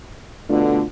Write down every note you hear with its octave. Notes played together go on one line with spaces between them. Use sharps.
B2 D3 A3 D4 F4